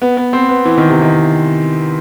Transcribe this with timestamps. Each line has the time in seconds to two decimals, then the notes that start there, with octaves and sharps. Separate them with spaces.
0.02 B3
0.17 B3
0.33 C4
0.49 B3
0.65 E3
0.78 D#3
0.89 C3
1.02 D#3